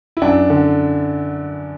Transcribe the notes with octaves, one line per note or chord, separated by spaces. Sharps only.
E4
F#2 D4
D3